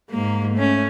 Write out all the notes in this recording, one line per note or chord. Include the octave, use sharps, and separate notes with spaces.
G#2 A#3
A3 C#4